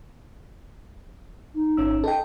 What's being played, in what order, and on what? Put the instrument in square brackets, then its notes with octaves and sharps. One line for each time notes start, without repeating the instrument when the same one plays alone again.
[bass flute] D#4
[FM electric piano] G#1 C#4 E6
[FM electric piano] A4 G5 [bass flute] D#5